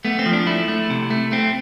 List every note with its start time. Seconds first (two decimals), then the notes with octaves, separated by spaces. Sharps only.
0.05 A3 B3
0.19 C4
0.26 F3
0.33 D4
0.47 A3 E4
0.68 A3
0.90 C3
1.10 A3
1.32 A3 C4